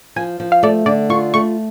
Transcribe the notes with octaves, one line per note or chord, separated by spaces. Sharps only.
F3 G#5
F3
F5
A3 D5
D3 D5
F4 C#6
A3 C#6